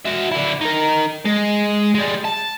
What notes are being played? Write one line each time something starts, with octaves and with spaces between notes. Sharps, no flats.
F#4 E5
D3 E4
D#4 A#4
G#3
G3 G#3
A5